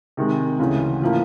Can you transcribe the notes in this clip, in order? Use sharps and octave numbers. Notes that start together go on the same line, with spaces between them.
C3 D#3 G#3
D2 C#3 E3
A2 F3 A#3